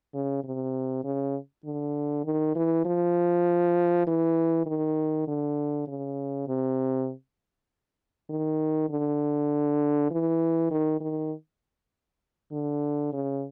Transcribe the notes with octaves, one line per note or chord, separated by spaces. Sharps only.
C#3
C3
C#3
D3
D#3
E3
F3
E3
D#3
D3
C#3
C3
D#3
D3
E3
D#3
D#3
D3
C#3